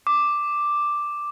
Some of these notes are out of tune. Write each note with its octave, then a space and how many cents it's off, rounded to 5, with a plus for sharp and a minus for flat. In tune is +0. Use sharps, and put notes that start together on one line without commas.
D6 +5